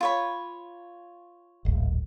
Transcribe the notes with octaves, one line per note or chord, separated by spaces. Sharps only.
F4 C#5 B5
D1 G#1